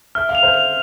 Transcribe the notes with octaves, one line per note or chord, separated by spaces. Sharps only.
E5 F6
F5
F7
C5 E5
F7